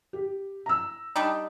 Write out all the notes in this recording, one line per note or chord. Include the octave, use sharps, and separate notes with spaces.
G4
A#5 E6
G3 D4 D#4